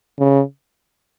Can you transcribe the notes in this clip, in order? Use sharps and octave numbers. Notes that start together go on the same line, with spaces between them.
C#3